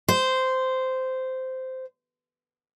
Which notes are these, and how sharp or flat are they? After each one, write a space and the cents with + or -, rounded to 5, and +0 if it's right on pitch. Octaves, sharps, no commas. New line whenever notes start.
C5 -10